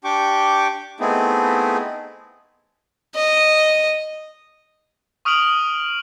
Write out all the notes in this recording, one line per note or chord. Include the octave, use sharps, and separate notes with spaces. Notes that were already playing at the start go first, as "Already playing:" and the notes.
D4 G4 G5 C#6 D6
A3 B3 C4 D#4 E4 G#4
D#5
C#6 D#6 F6 D7 F7 F#7